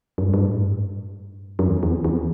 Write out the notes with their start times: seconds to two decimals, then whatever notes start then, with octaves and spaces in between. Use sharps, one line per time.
0.18 F#2
0.22 G2
0.34 G2
0.45 A2
0.57 G2
1.59 F#2
1.68 E2
1.83 E2
2.05 E2